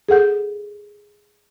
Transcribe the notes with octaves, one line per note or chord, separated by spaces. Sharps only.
G#4 A4 F#5 G6